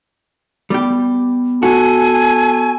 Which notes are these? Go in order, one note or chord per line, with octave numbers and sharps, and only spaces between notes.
G3 B3 G4
F#4 A4 G#5